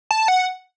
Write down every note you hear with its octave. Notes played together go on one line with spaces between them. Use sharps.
A5
F#5